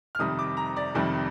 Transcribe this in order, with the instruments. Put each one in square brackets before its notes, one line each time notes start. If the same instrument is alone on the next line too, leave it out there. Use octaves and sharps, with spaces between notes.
[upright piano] F6
F2 C3 D#3 G3 D#6
D6
A#5
D5
F2 C3 D#3 G3